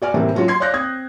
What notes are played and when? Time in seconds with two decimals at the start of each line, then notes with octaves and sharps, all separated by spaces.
0.02 F#4 D5 G#5 F6
0.14 A2 C3 E3 G3 A#3 C4
0.35 F#3 C#4 F4 F#4 C#5
0.48 C6 G#6 C7
0.60 C#5 D5 F5 F#6 G6 A#6
0.73 C4 D#6 G#6